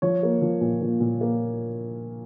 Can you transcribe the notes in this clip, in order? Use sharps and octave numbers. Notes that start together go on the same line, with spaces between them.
F3 C#5
A#3
F3
A#2
A#2
A#2
A#3